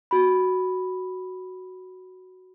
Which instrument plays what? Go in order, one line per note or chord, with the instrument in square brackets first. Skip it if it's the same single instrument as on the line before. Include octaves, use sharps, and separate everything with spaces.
[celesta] F#4 B5